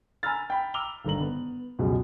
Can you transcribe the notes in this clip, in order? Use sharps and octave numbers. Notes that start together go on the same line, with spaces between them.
G#5 A#5 B5 E6 F6 A6
G5 B5
A#5 D6 E6 F6 F7 G7
G#1 G2 D3 A#5 F#7
B3
C#2 F#2 B2 G3 G#3